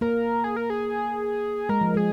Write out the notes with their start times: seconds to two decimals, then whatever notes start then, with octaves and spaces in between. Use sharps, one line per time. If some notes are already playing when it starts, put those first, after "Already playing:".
0.01 A#3 A#4
0.44 G#4
0.56 A#4
0.70 G#4
1.69 G#3 A#4
1.81 F3
1.94 G#3 G#4